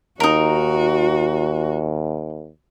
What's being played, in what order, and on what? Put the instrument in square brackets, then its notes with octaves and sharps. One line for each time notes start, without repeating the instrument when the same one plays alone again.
[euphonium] D#2 [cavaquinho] D#4 A#4 [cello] F#4